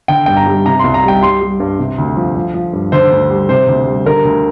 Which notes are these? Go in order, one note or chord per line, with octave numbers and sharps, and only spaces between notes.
D3 G5
G2 G5
A#5
G3
C3 A#5
C2 C6
A#5
G3
G5
G3 C6
G3
G2
C3
D2
F3
F3
F3
G2
D3 C5
D2
G3
C3 C5
D2
G3
D3 A#4
D2